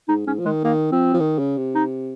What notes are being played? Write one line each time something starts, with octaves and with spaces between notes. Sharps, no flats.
G#2 D#4
G#2 C#4
F3
D#3 G#3
D#3 A#3
F3 C4
F3
D#3
C#3
C3
D#4